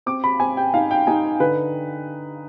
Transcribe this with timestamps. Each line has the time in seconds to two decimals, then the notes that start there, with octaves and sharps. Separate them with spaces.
0.06 C4 D6
0.24 B5
0.40 C4 G#5
0.57 G5
0.74 D#4 F5
0.91 G5
1.07 D#4 G#5
1.40 D3 B4